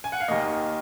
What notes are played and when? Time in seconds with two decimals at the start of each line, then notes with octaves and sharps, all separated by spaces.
0.04 G#5
0.12 F#5
0.20 F5
0.28 D#2 D#3 A#3 D#5